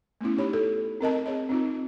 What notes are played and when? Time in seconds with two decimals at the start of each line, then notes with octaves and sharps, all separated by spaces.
0.21 A3 B3 C#4 E4
0.37 D#4 G4 C#5 B5
0.53 A4
1.01 C4 A#4 D#5 A5
1.26 G#4 C#5 D#5
1.49 C4 D#4 F4